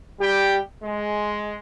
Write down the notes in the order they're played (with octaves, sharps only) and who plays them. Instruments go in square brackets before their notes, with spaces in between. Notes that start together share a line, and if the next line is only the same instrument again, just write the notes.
[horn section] G3 G4 G5
G#3